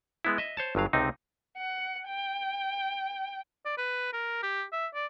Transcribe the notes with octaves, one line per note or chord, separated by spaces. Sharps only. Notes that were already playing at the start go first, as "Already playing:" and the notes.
G#3 B3 E4
D#5 E5
C5 C#5 A5
G1 G2 F#3 F5
C#2 C3 C4 D#4
F#5
G5
D5
B4
A#4
G4
E5
D5